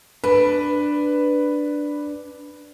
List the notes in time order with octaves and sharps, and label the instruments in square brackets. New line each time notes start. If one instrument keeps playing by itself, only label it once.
[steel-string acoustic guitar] D4 [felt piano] B4